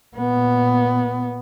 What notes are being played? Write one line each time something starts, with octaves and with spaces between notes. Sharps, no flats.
A#2 B3